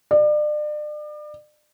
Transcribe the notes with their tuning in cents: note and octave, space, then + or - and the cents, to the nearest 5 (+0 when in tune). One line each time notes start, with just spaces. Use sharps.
D5 +35